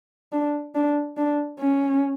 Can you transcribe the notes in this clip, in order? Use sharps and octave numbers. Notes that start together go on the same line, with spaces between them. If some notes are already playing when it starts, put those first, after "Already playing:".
D4
D4
D4
C#4